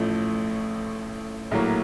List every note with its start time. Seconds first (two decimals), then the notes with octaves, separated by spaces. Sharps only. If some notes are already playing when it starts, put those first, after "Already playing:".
Already playing: A1 A2 F3 A3
1.51 A#1 A2 F#3 A#3